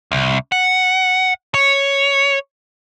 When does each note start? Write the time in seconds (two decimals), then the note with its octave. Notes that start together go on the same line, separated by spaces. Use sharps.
0.12 C2
0.52 F#5
1.54 C#5